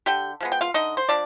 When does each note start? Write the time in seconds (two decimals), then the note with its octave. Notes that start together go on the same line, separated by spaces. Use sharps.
0.06 D3 G4 G5
0.41 F3 G#3 B3
0.52 G5
0.61 F4 F5
0.74 D3 D#4 D#5
0.97 C5
1.09 F3 D4 D5